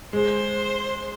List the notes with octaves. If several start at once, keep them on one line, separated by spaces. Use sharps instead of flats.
G#3 C5